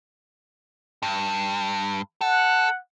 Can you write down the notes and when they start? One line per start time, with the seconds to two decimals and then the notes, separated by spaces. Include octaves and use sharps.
1.02 G2
2.21 A4 F#5